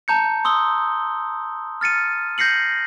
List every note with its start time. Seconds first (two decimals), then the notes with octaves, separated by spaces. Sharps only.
0.08 A5 A#5 G6 C#7
0.45 C6 D#6 E6 G7
1.81 F6 A6 C#7 D#7
2.38 G6 A#6 C7 C#7 F#7